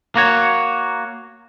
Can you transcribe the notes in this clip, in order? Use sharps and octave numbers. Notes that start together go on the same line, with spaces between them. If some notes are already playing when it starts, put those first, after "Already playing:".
A#3 F#4 C#5